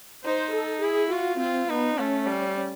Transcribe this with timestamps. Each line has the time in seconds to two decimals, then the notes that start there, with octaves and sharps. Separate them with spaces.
0.25 D#4 C5
0.54 A4
0.83 E4 G#4
1.12 F4 F#4
1.40 C4 F4
1.69 B3 D#4
1.98 A3 C#4
2.27 G3